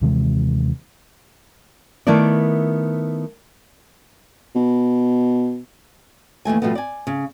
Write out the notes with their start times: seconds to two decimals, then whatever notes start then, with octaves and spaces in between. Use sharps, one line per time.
0.02 D#2 C3 E3 G#3
2.07 D#3 A3 B3 E4 A#4 D5
4.55 B2
6.45 D#2 E3 A3 G#5
6.62 B2 F3 G3 A3 B3
6.75 D5 G#5
7.07 C#3